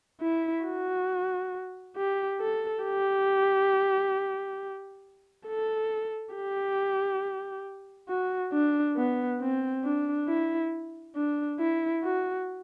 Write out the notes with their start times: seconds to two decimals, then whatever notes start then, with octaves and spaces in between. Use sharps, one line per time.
0.21 E4
0.65 F#4
1.96 G4
2.40 A4
2.84 G4
5.47 A4
6.34 G4
8.09 F#4
8.53 D4
8.96 B3
9.41 C4
9.84 D4
10.28 E4
11.15 D4
11.59 E4
12.03 F#4